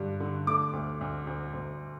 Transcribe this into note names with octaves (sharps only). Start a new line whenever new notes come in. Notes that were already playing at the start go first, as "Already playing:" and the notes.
Already playing: G2 D3 G3
D3
A3 D6
D2
D2
D2
D2